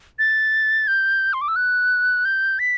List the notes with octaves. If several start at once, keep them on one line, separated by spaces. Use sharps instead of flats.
A6
G6
C6
D6
E6
F#6
G6
B6